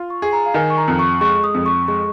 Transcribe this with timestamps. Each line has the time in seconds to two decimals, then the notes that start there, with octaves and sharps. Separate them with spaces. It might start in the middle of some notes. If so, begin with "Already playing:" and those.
Already playing: F4
0.10 C#6
0.22 G#4
0.33 A#5
0.46 F5
0.54 D#3 G#5
0.70 C#6
0.77 A#5
0.88 F2
0.99 C#6
1.21 G#3 C#6
1.44 D#6
1.54 F2
1.66 C#6
1.88 G#3 C#6